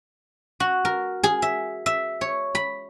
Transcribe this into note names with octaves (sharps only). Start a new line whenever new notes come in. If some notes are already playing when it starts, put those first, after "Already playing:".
F#4
A#4
G#4
E5
E5
C#5
B5